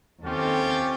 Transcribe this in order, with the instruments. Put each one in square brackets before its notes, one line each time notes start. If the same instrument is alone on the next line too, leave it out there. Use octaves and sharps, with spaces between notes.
[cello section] D#2 C4 A4 [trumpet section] C#4 F4 G4